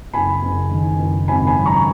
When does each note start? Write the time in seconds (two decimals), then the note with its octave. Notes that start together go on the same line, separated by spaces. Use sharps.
0.13 F#1 G#5 B5
0.43 F#1
0.71 D#3
0.99 F#1
1.28 G#1 G#5 B5
1.47 G#5 B5
1.57 F#2
1.66 A#5 C#6